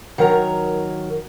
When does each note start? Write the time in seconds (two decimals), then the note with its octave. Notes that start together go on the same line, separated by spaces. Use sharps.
0.18 D#3 F#3 A#4 A#5